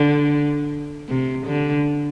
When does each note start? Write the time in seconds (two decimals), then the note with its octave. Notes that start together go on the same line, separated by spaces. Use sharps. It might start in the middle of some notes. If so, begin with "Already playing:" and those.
Already playing: D3
1.09 C3
1.47 D3